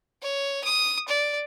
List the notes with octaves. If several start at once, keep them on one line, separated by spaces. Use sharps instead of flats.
C#5
D#6
D5